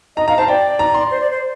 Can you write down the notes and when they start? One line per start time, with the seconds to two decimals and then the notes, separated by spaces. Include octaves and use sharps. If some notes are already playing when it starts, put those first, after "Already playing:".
0.17 D#5 A#5
0.28 F5 A#5
0.37 C5 A5
0.48 D5 G5
0.79 A#5
0.94 C6
1.11 C5
1.21 D5
1.31 C5